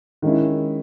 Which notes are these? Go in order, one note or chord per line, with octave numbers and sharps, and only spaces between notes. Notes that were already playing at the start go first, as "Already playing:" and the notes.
D#3 G#3 C#4 E4